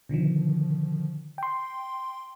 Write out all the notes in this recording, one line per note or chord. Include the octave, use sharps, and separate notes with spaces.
B2 D3 D#3 F3
G5 C6